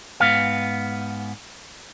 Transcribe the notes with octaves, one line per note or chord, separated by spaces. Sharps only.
G#2 B3 F5